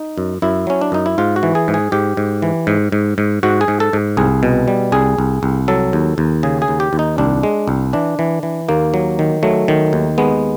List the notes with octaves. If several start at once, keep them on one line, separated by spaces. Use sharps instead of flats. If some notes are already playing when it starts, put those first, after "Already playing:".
Already playing: D#4
F#2
F#2 E4
F#3 C#4
D4
F#2 D#4
E4
G#2 F4
F#4
E3
G#4
G#2
G#4
G#2 G4
G#2
E3
G#2
G#2
G#2
G#2 F#4
G#4
G#2
A4
G#2
C2 G#4
B2
G3
C2 G#4
C2
C2
F#3 A4
D#2
D#2
C#3 G#4
G#4
D#2
G4
D#2
D#4
C2 D4
G#3
C2
E3 D4
E3
E3
D#2 A#3
F#3
D#3
F#3 A3
D#3
D#2
G#3 B3